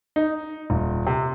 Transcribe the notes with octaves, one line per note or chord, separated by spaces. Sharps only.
D#4
D#1
C3